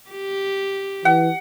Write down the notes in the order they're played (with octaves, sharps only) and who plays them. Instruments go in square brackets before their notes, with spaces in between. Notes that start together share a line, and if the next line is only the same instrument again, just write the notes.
[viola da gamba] G4
[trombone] E3 [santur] F#5